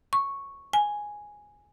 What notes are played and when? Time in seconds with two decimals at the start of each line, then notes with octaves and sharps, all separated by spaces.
0.13 C#6
0.73 G#5